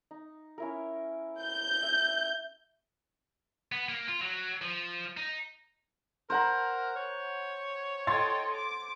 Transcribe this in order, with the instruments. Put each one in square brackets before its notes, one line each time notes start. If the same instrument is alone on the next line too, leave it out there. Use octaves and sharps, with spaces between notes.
[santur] D#4
C#4 E4 A#4
[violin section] G6
[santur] E5
[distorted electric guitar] B3
A#3
F4
F#3
F3
D#4
[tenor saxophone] A#4 [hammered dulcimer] C5 F#5 A#5
[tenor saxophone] C#5
[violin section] A4 D#5 G5 [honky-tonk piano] C6 G#6 A6
[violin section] D6